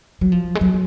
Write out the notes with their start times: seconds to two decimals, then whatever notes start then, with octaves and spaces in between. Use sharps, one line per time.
0.21 F#3
0.32 F3
0.55 G#3
0.61 F#3